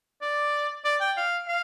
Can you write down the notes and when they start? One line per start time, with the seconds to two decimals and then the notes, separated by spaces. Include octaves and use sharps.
0.22 D5
0.85 D5
1.01 G5
1.17 F5
1.48 F5